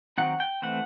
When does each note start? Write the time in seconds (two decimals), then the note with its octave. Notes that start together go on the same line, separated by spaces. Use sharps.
0.18 D#3 F#3 C4 D#4 F#5
0.40 G5
0.62 E3 A3 C4 F#5